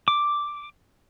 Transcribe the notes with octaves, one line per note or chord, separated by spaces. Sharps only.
D6